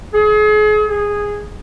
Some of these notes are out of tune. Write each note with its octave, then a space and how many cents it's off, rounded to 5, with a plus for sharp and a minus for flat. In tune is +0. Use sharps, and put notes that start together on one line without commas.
G#4 +35
G#4 -10